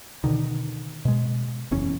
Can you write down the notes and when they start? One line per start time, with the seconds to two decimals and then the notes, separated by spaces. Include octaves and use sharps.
0.24 B2 D3 D#3
1.05 B2 G#3
1.71 F#1 E2 C#4